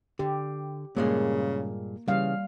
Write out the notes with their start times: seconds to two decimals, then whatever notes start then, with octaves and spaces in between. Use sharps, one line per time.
0.19 D3 G4
0.97 G2 A#2 C#3 G#3 A#3
2.08 C#3 E3 G3 F5